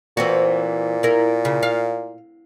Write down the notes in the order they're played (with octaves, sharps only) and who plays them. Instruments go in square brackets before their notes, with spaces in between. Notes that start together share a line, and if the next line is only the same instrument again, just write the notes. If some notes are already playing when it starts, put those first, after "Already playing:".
[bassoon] A#2 [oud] E3 C4 F#4
[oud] E4 A#4
C#3
F5